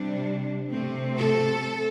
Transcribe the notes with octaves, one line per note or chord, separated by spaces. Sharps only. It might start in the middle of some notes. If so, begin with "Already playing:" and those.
Already playing: C3 G3 D4
C3 A3 C4
A3 A4